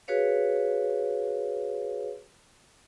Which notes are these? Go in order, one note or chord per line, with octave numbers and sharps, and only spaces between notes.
F#4 G#4 B4 C#5 F5